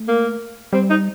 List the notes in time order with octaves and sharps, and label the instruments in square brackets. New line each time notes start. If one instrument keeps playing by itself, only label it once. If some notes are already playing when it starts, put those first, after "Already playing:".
Already playing: [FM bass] A3
[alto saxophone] A#3
[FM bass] G3 [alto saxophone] C4
[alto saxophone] D#4